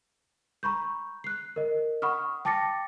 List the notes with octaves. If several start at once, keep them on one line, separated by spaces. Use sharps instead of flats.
A#5 B5 C#6 G6
F#6 C7
A#4 D#5
F#5 B5 C#6 D#6 F6
G5 A5 D6 A6 A#6 C#7